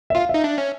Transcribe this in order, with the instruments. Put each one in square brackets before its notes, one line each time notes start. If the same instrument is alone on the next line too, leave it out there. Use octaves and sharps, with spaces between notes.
[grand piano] E5
[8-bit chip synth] F4 [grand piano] F5
[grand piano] E5
[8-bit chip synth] D#4
D4
C#4